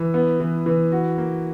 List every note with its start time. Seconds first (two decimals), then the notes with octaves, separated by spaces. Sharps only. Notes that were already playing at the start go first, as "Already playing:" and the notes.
Already playing: E3
0.14 B3
0.40 E3
0.66 E3
0.92 F#4
1.18 A#3